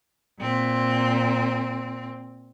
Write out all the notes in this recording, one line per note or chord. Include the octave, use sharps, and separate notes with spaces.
A#2 C4